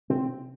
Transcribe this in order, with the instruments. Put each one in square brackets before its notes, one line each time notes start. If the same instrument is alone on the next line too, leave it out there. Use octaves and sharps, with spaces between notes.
[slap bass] C3 C4